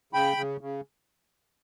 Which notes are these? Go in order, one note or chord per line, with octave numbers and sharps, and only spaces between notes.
C#3 G5 B5
C#3
C#3